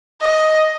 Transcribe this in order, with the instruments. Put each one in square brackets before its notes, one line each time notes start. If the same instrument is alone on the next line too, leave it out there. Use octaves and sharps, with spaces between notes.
[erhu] D#5